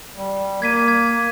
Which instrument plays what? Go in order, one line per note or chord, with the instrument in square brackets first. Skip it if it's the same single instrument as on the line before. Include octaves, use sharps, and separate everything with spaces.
[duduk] G3
[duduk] A#3 [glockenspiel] G#6 B6 D#7
[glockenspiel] G#6